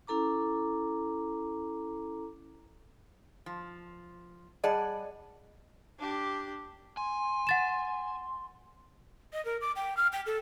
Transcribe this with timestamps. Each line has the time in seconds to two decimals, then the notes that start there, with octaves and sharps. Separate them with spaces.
0.07 C#4 E4 A4 A#5 D6
3.46 F3
4.64 G3 G#4 D5 D#5 F#5 A5
5.98 D4 G4
6.97 G#5 C6
7.47 F#5 A6 E7
9.33 D#5
9.45 A#4
9.61 D6
9.76 G5
9.97 F6
10.13 G5
10.26 A4